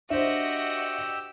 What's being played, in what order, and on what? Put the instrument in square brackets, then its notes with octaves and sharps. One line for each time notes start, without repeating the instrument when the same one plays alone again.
[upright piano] D4 C5 [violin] F#4 D#5 [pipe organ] G4 E6 [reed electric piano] E5